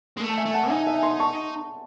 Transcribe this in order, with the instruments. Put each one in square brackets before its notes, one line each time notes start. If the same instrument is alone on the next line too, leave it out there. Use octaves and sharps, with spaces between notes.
[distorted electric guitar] G#3
A3
[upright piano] A5
E5 G#5
[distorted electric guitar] A3
[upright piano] F#5 A5
[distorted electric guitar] D#4 [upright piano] E5 G#5
[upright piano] E5 G#5
G#5 C6
A5 C#6